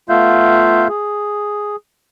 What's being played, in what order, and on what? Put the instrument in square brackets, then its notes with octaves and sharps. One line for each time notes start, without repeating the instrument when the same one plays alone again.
[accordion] A3 B3 F4 E5 F5 G6
G#4